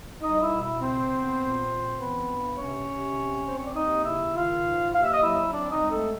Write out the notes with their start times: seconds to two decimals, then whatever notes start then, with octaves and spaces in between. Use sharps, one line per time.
0.22 C2 D#4 D#5
0.41 E4 E5
0.52 B2
0.61 E4 E5
0.80 C#3 C4 C5
1.10 B3
1.40 A#2
1.69 C4
1.98 E3 B3 B4
2.28 G2
2.57 C3 C#4 C#5
2.87 C3
3.16 C4
3.45 C4 C5
3.57 C#5
3.66 D5
3.75 D#2 D#4 D#5
4.04 C#3 E4 E5
4.33 D#3 F4 F5
4.63 G#2
4.93 D#2 F5
5.03 E5
5.13 D#5
5.22 F#3 E4 E5
5.51 C4 D4 D5
5.71 D#4 D#5
5.80 G#3
5.91 A3 A4